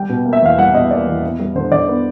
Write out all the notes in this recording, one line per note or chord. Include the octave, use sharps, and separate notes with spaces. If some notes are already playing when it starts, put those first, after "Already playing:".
Already playing: G3 G5
B2
A#3
E5
E2 F5
G3 F#5
B2 D#5
A#3 D5
E2
B3
G3
D3 C5
D3 D5
B3